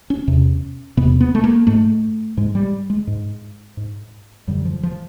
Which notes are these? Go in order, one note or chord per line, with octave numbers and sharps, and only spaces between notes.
C#4
E2 C3
E2 C3 B3
B3
A3
A#3
G#2 A3
G#2 G#3
G3
G#3
G#2
G#2
F#2 D3 G3
F3
F3